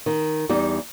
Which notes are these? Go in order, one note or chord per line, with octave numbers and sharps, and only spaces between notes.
D#3
E2 G3 D#4